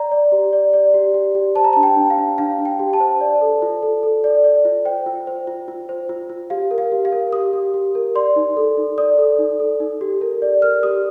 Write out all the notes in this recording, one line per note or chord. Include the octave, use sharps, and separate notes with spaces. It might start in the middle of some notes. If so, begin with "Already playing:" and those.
Already playing: D5 A#5
D5
G4
D5
D5
G4
G4
G4
C5 A5
A#5
D4 A5
G5
D4
F5
D4
D4 F5
D4
G5
G4
A5
C5
D5
A4
F4
A4
A4
D5
D5
F4
C5 G5
F4
C5
F4
F4
C5
F4
F4
G4 F5
A#4
F5
G4
F5
A#4
G4 D#6
G4
G4
A#4
D5 C6
D#4
A4
D#4
D5 D#6
A4
D#4
A4
D#4
G4
A#4
D5
A#4 F6
G4 D#6